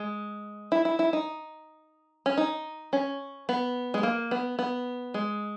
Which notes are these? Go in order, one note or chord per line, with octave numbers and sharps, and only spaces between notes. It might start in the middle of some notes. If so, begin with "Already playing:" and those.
Already playing: G#3
E4
E4
E4
D#4
C#4
D#4
C#4
B3
G#3
A#3
B3
B3
G#3